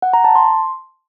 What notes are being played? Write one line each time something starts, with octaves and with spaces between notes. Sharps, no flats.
F#5
A#5
A5
C6